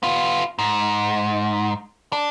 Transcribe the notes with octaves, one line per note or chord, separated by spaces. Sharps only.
B3 F4
G#2
D4